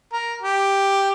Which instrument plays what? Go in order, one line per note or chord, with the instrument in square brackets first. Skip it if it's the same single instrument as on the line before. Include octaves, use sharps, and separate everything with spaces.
[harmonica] A#4
G4